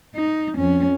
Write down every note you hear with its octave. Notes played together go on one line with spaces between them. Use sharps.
D#4
F2 C#4